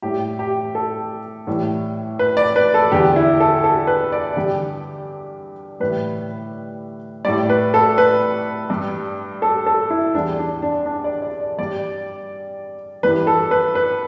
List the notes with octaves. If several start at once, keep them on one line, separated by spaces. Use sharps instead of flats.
A2 G3 G4
G4
A4
A2 E3 G3
B4
D5
B4
A4
E2 D3 G3 G4
E4
A4
A4
B4
D5
G2 D3 G3 G4
A2 E3 G3 B4
A2 G3 D5
B4
A4
B4
G2 G3
A4
A4
E4
E2 E3 G3 D4
D4
D4
D4
D5
D5
D5
G2 G3 D5
G2 E3 G3 B4
A4
B4
B4